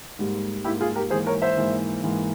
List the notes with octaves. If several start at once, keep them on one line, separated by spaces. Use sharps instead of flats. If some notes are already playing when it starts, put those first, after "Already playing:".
G#2 G3 A#3
G#2 G3 A#3 E4 G4
F4 G#4
G4 A#4
G#2 E3 A#3 G#4 C5
A#4 C#5
C5 E5
G#2 E3 A#3
G#2 E3 A#3